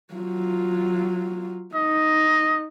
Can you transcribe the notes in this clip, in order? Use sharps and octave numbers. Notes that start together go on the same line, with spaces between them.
F#3 F4
D#4 D#5